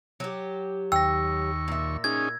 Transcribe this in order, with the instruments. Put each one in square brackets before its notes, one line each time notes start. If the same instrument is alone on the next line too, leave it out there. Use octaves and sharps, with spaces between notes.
[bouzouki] F#3 G4
[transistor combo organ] D#2 C#6 [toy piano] G5 [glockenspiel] E6 A#6
[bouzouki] A#2 E5
[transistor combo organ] C#4 D#4 G#4 [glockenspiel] G#6